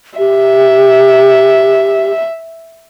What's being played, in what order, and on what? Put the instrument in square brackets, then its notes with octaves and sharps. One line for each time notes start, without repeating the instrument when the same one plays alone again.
[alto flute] G4 [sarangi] E5